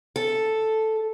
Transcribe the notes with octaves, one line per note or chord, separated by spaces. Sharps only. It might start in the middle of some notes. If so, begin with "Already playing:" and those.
A4